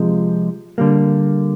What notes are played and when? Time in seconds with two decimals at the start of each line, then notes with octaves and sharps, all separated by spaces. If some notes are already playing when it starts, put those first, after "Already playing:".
Already playing: C3 F3 G#3
0.78 D3 G3 A#3